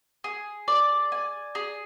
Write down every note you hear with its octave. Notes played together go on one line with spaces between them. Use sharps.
G#4
D5
G#5
G#4